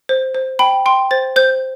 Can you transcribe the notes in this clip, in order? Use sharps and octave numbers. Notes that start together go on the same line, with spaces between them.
C5
C5
G5 B5
G5 C6
C5 A6
C5 G6